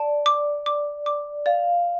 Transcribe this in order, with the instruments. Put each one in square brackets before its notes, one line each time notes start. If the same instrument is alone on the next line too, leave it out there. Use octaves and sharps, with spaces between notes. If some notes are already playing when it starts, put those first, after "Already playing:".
Already playing: [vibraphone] D5 [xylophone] A5
[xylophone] D6
D6
D6
[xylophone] D5 [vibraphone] F5